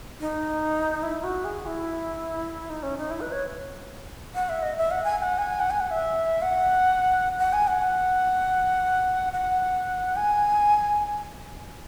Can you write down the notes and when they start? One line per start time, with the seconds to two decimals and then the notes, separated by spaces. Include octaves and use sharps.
0.20 D#4
1.03 E4
1.23 F#4
1.45 G#4
1.66 E4
2.70 D#4
2.83 C#4
2.97 D#4
3.11 E4
3.21 B4
3.32 C#5
4.35 F#5
4.49 E5
4.62 D#5
4.77 E5
4.91 F#5
5.04 G#5
5.18 G#5
5.22 F#5
5.38 G#5
5.60 F#5
5.70 G#5
5.80 F#5
5.91 E5
6.42 F#5
7.39 F#5
7.53 G#5
7.67 F#5
9.33 F#5
10.16 G#5